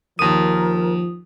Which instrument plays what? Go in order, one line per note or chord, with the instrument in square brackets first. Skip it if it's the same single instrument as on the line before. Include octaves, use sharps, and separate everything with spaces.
[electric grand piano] D#2 D#7 [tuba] F3 [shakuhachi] A#4 [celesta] D#6